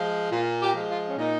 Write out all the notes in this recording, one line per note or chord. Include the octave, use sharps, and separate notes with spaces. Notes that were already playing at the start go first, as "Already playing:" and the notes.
Already playing: F3 G#3
A#2 F4
G4
F3 G#3
F4
C#4
A#2 D#4